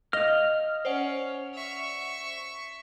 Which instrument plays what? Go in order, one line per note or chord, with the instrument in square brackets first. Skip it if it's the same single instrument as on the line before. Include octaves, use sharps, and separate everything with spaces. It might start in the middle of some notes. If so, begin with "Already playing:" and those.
[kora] D#5 [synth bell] F5 [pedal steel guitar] F6
[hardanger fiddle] C#4 [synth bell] C5 D5 F#5
[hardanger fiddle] E5 C#6